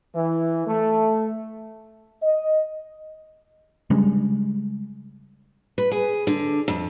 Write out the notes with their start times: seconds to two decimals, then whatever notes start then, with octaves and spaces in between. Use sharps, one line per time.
0.14 E3
0.66 A3
2.22 D#5
3.90 C#3 G3 G#3 D4
5.78 B4
5.91 G#4
6.27 D3
6.68 F2